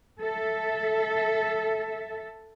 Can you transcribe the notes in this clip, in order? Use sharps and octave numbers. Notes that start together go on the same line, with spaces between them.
A4 E5